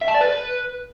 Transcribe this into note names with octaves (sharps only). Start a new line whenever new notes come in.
E5
A5
D5
B4